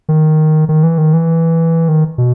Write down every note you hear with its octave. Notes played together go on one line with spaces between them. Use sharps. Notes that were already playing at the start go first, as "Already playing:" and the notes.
D#3
D#3
E3
D#3
E3
D#3
B2